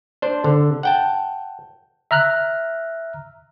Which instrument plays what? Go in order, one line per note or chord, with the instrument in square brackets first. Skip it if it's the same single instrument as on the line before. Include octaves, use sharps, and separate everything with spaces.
[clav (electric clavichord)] D4 C5
D3
F#5 G5 A5
[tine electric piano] E5 A#5 F6 F#6